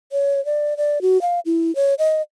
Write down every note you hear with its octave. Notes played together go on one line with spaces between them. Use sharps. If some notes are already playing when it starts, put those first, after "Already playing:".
C#5
D5
D5
F#4
F5
E4
C#5
D#5